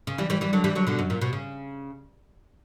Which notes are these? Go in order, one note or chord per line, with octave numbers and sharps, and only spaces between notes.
C#3
E3 G3
E3 G3
E3 G3
D3 F#3
E3 G3
D3 F#3
B2 D3
F#2
A#2
B2
C#3